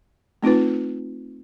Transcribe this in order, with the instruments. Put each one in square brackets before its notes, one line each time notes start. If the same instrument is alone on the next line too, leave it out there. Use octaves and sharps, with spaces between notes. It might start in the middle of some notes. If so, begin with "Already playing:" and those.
[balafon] A3 C4 D#4 F4 B4